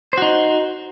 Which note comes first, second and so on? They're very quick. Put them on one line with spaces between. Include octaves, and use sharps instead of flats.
C5 F#4 D#4